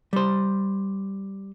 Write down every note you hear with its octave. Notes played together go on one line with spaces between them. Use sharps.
G3 C5